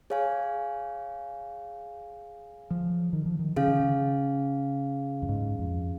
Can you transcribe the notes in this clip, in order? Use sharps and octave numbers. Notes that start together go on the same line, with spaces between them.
G#4 C#5 F5 G#5
F3
D#3
F3
D#3
C#3 C#4 G#4 F5
D#3
C#3
F2
G#2
F2